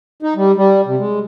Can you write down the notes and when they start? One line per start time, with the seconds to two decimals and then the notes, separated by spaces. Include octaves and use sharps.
0.23 D#4
0.36 G3
0.56 G3
0.86 C3
0.99 G#3